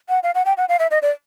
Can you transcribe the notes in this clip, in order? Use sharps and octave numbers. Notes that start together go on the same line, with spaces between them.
F#5
F5
F#5
G5
F#5
F5
E5
D#5
D5